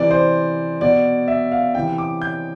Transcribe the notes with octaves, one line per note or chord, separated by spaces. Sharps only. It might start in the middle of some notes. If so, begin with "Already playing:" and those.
Already playing: C3 E3 D5
C5
B2 D5
E5
F5
C3 E3 G5
D6
G6